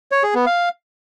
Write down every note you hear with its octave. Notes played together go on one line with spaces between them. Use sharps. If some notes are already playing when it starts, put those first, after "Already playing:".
C#5
G#4
B3
F5